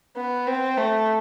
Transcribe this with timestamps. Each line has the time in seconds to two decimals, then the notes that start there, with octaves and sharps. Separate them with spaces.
0.16 B3
0.47 C4
0.77 A3